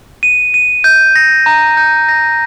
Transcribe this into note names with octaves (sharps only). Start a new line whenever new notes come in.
D#7
D#7
G6
A#6
A#5
G6
A#6